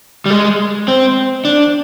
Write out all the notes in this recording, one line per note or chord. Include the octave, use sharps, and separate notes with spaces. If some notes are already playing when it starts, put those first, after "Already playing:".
G3
G#3
C4
D4